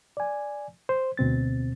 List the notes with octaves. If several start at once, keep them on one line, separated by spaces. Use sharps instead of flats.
D5 G#5
C5
D2 B2 C4 A6